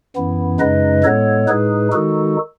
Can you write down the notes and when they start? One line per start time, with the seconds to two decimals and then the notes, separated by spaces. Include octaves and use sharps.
0.16 F#2 E3 B3 E4
0.60 F#2 C#3 G#3 D#4 B4 D#5
1.04 A2 G#3 B3 A4 C#5
1.48 A2 G#3 D#4 G#4 B4
1.92 D#3 G#3 D#4 F#4 A4